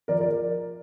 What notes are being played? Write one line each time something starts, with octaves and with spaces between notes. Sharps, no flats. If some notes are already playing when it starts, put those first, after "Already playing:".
F3 A#4 D5
A#4 D5